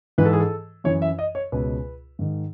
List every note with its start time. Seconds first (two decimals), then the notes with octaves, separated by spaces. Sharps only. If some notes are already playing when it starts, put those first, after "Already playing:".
0.18 G#2 E3 B4
0.25 A4
0.33 G#4
0.40 A4
0.84 F#2 E3 C#5
1.02 E5
1.19 D#5
1.35 C#5
1.52 C#2 B2 B4
2.19 G#2 D#3